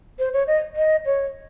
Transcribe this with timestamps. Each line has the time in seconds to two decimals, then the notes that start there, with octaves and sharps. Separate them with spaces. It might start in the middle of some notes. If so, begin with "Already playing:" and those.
0.19 C5
0.33 C#5
0.47 D#5
0.76 D#5
1.06 C#5